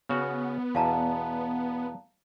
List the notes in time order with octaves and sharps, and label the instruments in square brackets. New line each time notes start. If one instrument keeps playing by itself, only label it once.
[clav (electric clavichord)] C#3 F#4 [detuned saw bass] B3
[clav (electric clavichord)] E2 B2 [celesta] F5 A5 A#5